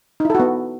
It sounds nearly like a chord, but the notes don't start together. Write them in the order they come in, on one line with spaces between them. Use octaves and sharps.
D#4 E4 A4 F#4 B3